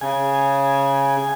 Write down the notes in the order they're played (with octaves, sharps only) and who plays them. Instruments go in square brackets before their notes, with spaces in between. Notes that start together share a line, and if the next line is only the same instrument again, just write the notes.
[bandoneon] C#3 [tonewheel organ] G#5